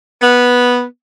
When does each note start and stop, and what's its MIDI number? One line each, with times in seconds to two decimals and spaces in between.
0.22 0.82 59